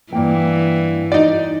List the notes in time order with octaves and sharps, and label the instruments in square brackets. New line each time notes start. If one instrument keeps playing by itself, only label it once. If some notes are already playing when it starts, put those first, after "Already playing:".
[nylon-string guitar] G2 A#3 G5 [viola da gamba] E3
[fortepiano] D#4 D5